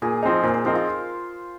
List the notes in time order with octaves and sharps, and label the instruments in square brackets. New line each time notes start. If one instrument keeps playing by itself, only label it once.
[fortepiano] A#2 [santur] G#4
[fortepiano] F3 C4 D#4 [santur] G#4
[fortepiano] A#2 [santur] C5
[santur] C5
[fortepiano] F3 C4 D#4 [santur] A#4
[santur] F4